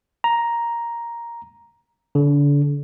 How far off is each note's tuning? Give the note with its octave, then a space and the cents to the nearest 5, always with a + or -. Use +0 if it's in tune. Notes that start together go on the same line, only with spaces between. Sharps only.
A#5 +5
D3 -35